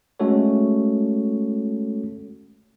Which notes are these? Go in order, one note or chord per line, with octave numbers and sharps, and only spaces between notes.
G#3 A3 C#4 F#4 A4 C#5